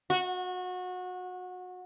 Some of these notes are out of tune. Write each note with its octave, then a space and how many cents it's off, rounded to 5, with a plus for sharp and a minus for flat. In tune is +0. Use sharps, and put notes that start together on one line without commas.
F#4 -25